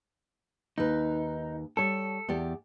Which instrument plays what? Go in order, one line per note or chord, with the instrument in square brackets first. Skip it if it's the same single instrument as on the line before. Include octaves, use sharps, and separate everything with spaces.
[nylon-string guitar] D#2 B4 [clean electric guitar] D#4
[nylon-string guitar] G3 C#5 [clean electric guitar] A4
[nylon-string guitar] E2 G4 D5